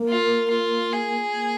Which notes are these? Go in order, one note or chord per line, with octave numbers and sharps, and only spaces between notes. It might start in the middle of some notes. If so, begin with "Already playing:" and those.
Already playing: A#3
F4
F4
G#4
A#3